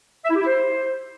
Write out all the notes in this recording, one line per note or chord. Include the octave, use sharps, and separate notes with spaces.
E5
E4
G4
E4
C5